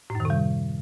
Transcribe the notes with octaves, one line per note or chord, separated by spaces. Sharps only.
A2
F#2
D#3
C3
G3